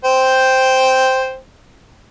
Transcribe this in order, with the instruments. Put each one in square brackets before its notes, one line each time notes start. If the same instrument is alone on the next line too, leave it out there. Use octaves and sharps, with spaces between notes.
[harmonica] C5 G5